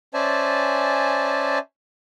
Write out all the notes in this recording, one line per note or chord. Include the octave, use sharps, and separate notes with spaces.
C#4 C5 D5 E5 G#5 A5